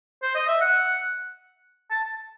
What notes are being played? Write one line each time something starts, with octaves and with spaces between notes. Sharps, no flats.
C5
D#5
E5
F#5
A5